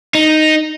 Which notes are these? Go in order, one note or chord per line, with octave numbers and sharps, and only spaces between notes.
D#4